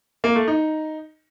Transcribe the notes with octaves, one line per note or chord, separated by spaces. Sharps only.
A#3
A3
D#4